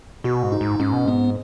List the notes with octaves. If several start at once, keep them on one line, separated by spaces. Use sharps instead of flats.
B2 F#4
G#2
D#4
G#2
G#2 C#4
B2
G#2 B3